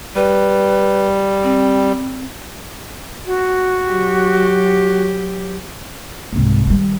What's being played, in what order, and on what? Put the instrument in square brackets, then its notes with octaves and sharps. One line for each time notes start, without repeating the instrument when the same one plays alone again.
[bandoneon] G3 [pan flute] B4
[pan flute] C4
[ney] F#4
[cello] F#3 G4
[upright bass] C2 G#2
D#3 G3